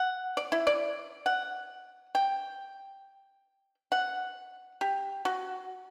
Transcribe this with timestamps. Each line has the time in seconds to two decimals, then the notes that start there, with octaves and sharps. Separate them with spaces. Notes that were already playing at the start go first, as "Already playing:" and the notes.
Already playing: F#5
0.37 D5
0.52 E4
0.67 D5
1.26 F#5
2.15 G5
3.92 F#5
4.81 G4
5.25 F#4